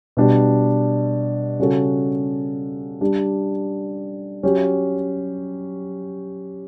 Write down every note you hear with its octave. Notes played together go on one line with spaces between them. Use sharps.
B2 G3 D4 G4
C#3 G3 C#4 F#4 A4
G3 D4 G4
F#3 C#4 G4